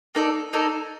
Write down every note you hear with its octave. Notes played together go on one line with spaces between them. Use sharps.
A#3 D#4 A4 D5
A#3 D#4 A4 D5